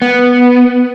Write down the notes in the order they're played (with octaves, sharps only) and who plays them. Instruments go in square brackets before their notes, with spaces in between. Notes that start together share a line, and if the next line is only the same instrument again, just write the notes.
[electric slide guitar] B3